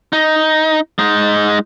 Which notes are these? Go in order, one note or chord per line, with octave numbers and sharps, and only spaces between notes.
D#4
G#3 D#4